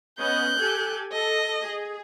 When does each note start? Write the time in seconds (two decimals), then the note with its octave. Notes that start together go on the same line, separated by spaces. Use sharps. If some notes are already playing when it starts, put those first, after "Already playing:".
0.19 B3 C#4 D#5 F#6 G6
0.59 G4 A4 G#5
1.12 A4 D#5
1.63 G#4